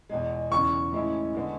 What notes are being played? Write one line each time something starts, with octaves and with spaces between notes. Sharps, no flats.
E2 B2 G#3
E2 C#3 E3 C#6
A2 E3 G#3 C#4 E4
D3 G#3 B3